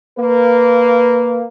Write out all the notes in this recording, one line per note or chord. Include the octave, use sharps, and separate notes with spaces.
A#3 B4